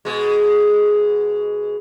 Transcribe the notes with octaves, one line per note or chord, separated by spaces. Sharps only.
B2 G#3